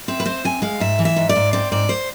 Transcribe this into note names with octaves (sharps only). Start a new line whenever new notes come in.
C4 E5
B4
C4 C5
C4 G#5
G#3 F5
G#2 E5
E3
E5
G#2
D5
G#2
C4 D5
G#2 D5
C5